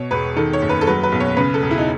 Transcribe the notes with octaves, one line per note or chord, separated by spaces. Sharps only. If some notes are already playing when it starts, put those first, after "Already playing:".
Already playing: B2 C#5
E1 B4
D#3 A4
C#5
F#1
B4
A4
F#3 B4
B4
B1
C#5
C#3 B4
A4
E1
E4
D#4